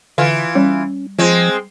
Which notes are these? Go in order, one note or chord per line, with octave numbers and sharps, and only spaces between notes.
D3 E3 F4
G3 C#4
F3 G#3 C4